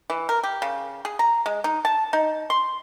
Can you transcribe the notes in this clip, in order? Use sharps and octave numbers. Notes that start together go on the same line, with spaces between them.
E3
A#4
G4
C#3
G#4
A#5
G#3
D#4
A5
D#4
C6